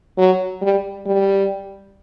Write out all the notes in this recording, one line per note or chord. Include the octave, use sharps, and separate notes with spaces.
F#3
G3
G3